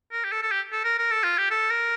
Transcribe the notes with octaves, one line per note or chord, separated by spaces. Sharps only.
A#4
G4
A4
A4
G4
A4
A#4
A#4
A4
F4
G4
A4
A#4